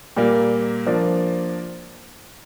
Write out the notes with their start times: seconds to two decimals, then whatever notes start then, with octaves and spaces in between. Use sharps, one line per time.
0.17 A#2 G3 A#3
0.87 F3 A#3 D4